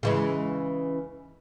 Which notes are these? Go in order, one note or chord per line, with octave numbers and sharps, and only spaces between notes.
C#3 E3 G#3